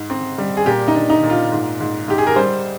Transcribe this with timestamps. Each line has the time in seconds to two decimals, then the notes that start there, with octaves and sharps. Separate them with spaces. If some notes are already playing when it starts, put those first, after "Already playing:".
Already playing: G#2
0.10 C4
0.38 G3
0.57 G#4
0.66 A#2 G4
0.88 D#4
0.95 D4
1.10 D#4
1.23 A#2
1.30 F4
1.52 G#2
1.80 G#2
2.08 G#2 G4
2.18 G#4
2.27 A#4
2.36 G3 C5